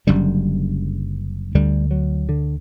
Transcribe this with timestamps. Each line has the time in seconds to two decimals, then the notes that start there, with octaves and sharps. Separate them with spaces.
0.07 F#1 F#2 D3 G3
1.55 D2 D3 G3
1.91 F#3
2.29 D3